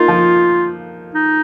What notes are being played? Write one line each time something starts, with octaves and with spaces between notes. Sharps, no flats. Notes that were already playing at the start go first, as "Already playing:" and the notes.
Already playing: A#3 D#4 F4
F3
D#4